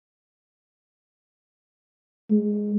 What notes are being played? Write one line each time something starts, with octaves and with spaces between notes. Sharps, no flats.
G#3